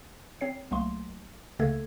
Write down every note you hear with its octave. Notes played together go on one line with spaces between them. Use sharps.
C4 C#5 C7
C2 F#3 A3 A#3 C6
C#2 C#3 A3 A#3 A4 G#6